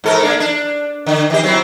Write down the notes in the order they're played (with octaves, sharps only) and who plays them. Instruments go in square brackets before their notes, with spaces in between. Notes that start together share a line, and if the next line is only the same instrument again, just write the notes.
[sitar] G#2 A4 A#4
A#3 D4
D4
D3
D#3 G4
F#3 C4 E4